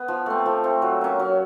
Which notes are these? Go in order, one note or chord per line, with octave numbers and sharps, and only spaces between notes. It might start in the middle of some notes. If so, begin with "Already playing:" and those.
Already playing: B3
F3
A3 C4
F3
A3 C4
F#3
A#3 C#4
F#3